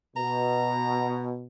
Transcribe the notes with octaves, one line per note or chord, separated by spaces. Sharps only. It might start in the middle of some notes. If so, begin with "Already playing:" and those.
B2 A#5